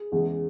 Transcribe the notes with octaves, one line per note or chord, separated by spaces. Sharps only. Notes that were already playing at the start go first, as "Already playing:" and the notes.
Already playing: G#4
E2 C#3 E3 G#3